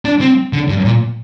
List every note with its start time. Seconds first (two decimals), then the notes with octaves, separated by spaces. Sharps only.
0.05 D4
0.21 C4
0.53 D3
0.69 G2
0.85 A#2